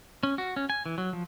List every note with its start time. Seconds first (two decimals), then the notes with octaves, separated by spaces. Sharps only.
0.23 C#4
0.38 F#4
0.56 C#4
0.70 G#5
0.86 E3
0.98 F#3
1.13 F3